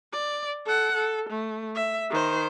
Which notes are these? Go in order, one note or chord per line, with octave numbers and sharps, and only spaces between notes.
D5
A4 F#5
A4
A3
E5
D#3 C5